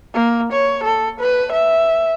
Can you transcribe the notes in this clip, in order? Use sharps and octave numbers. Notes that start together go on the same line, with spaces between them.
A#3
C#5
A4
B4
E5